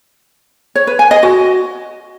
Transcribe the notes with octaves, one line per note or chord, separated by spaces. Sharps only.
C#5
B4
G#5
D#5
F#4